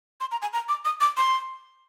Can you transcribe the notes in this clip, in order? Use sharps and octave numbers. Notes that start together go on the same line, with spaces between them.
C6
A#5
G#5
A#5
D6
D#6
D6
C6